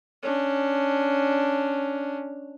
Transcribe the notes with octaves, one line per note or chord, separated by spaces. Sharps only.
C#4 D4